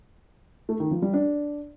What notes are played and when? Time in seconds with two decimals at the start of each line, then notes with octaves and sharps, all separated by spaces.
0.69 A3
0.80 D#3
0.91 F3
1.02 G3
1.14 D4